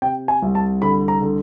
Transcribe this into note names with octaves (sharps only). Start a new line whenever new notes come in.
C3 G5
G#5
C2
A5
D3 B5
A#5
D3